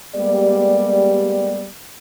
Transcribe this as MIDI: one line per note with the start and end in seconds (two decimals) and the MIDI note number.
0.15 1.66 55
0.15 1.66 56
0.15 1.66 58
0.15 1.66 59
0.15 1.66 67
0.15 1.66 74